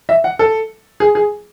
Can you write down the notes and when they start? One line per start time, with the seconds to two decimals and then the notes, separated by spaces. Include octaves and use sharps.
0.09 E5
0.24 F#5
0.39 A4
1.00 G#4
1.15 G#4